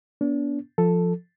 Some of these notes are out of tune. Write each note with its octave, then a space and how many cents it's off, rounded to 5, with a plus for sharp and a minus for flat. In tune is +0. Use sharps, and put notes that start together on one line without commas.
B3 -35 D4 -35
F3 +0 A4 +0